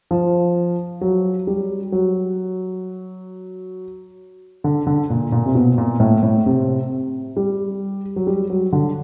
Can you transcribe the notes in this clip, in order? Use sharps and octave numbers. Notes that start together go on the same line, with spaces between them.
F3
F#3
G3
F#3
D3
D3
A#2
A#2
C3
B2
A#2
A2
A2
C3
G3
F#3
G3
F#3
D3